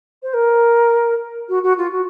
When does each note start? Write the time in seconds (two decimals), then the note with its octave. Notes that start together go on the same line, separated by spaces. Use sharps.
0.23 C5
0.34 A#4
1.49 F#4
1.63 F#4
1.77 F4
1.92 F#4